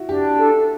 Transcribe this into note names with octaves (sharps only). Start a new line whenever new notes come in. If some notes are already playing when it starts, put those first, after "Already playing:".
Already playing: E4 F#4
D4 G4
A4